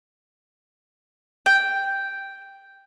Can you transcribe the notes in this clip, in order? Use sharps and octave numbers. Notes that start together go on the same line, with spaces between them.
G5